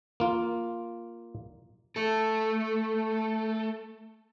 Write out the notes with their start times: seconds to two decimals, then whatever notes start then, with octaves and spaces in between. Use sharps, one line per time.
0.20 A#3 F4
1.96 A3 A4